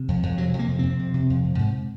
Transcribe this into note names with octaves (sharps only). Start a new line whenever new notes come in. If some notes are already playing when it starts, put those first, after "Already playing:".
Already playing: C3
F2
F2
C3 F#3
F2
A#3
C3
F2 C4
C3
C3
F2
C3
G#2